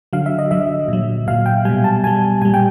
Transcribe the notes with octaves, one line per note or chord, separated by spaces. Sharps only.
D3 F#3 F5
E5
D#5
D3 F#3 E5
A#2 F#3
A#2 F#3 F5
G5
B2 G3 G#5
A5
B2 G3 G#5
A#2 G3 G#5
G5